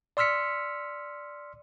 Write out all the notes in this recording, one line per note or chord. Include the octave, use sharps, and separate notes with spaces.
D5 C6 E6 F6 B6 C#7